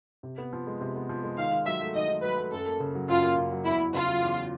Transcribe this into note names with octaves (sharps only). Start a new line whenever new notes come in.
C3
B3
F3
G#3
C3
B3
F3
G#3
D#3 F5
D#3
F#3 E5
A3
D#3 D#5
D#3
F#3 B4
A3
F#2 A4
A#3
C#3
F#3
F#2 F4
A#3
C#3
F#3
E2 E4
E2
C#3 F4
F#3
E2